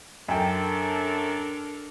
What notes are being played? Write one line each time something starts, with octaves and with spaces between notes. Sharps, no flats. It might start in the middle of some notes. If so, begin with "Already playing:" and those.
F#2 D4 A4 A#4 G5